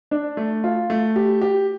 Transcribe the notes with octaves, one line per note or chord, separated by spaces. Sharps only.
D4
A3
F4
A3
G4
G4